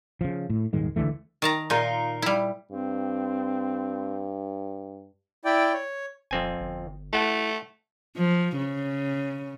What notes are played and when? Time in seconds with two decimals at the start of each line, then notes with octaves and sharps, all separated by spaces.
0.21 C#3 F3
0.50 A2
0.73 D#1 G#2 D#3 G#3
0.96 C#2 D3 E3 A3
1.42 D#3 A5 A#5
1.70 A#2 D#4 F4 A#4
2.22 G3 E4
2.71 G2 C4
5.45 E4 D5 G5
5.73 C#5
6.31 D#1 F2 C4 G#5
6.61 G1
7.13 A3 E4 F#5 A5
8.17 F3
8.57 C#3